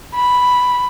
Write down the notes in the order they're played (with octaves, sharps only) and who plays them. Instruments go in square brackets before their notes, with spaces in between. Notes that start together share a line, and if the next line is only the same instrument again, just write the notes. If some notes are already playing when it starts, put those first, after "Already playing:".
[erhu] B5